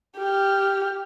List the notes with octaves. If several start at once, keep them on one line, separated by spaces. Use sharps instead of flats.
G4 F6